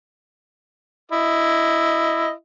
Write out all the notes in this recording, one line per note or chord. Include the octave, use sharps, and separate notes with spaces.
E4 D#5